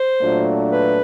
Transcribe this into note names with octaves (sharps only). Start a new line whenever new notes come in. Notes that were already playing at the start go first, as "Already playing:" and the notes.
Already playing: C5
A#2 F#3 A3 D4 F4
B4